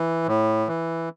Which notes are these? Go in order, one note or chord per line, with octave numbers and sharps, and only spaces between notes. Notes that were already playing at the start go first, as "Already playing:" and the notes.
Already playing: E3
A2
E3